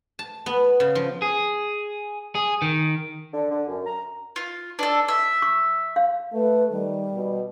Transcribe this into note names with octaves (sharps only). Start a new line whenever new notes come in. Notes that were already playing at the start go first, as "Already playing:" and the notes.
A5
B3
C#3
F3
G#4
G#4
D#3
D3
D3
F#2
A#5
F4
D4 A4
E5
C#6
F5
A3 B4
D#3 G3
B2